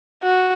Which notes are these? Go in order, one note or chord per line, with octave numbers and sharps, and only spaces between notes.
F#4